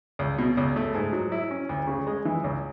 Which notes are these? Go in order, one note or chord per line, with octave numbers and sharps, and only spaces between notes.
C#2
B2
C#2
A3
G#2
F#3
E4
C#4
D2
C#3
G#3
E3
C#2